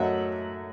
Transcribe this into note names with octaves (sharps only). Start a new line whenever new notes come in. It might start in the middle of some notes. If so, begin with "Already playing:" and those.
Already playing: F#2 F#3 A3 D#4 D#5 E5 F#5